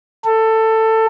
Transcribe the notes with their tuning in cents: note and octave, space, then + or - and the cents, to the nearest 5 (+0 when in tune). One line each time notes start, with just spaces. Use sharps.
A4 +15